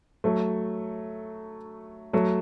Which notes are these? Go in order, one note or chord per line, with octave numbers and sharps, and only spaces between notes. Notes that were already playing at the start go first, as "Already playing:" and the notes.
F#3 A3
F#3 A3